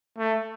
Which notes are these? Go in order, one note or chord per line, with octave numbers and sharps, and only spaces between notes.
A3